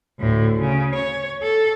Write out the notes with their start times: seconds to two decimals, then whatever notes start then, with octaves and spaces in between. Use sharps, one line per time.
0.20 D2 A2
0.60 C#3
0.95 C#5
1.42 A4